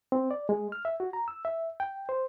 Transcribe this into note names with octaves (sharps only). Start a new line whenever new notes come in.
C4
D5
G#3
F6
E5
F#4
A#5
E6
E5
G5
C5